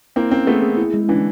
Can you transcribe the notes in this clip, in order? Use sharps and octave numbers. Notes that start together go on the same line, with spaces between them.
A#3 C4 E4
A#3 C4 C#4
A3 B3 G#4
G#4
E4
G#3
D3 E3 C#4